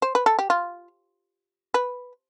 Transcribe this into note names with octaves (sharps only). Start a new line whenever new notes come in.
C5
B4
A4
G4
F4
B4